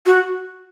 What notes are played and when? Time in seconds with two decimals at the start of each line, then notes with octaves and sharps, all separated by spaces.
0.06 F#4